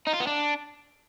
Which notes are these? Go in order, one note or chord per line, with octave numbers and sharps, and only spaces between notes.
D#4
F4
B3
D4